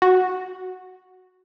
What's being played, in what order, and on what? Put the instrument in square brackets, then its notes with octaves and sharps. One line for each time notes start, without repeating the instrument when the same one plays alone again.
[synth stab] F#4